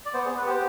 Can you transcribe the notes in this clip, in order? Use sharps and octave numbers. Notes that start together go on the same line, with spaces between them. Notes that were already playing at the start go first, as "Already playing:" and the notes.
D5
B3 C5
G#4
B3
B4
G4 C5